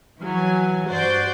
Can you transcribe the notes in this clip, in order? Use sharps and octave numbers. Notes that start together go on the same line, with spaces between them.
E3 F#3 G#5
G2 F#4 C5 D5 G6